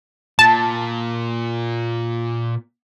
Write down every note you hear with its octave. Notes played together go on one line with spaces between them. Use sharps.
A#2 A5